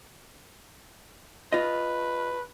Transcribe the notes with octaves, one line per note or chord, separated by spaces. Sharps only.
F4 B4 D#5